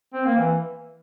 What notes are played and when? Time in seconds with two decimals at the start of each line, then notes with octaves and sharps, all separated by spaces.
0.14 C4
0.26 A#3
0.37 E3